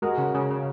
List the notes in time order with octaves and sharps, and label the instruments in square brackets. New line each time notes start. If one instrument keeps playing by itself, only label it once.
[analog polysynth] G#3 [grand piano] F#4 A#4
[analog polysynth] C#3
C#3
C#3